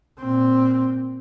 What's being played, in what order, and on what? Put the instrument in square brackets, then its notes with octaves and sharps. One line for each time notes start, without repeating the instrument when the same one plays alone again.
[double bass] A#2 C4